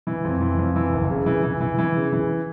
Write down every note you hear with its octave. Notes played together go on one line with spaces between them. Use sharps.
E3
F2
E3
F2
E3
F#1
C#3
E3
E3
E3
E3
C#3
E3